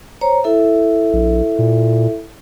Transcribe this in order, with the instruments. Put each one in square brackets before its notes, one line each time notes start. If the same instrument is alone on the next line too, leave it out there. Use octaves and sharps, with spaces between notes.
[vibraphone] C5 C#5 A#5
E4 A4 E5
[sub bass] A#1
A#2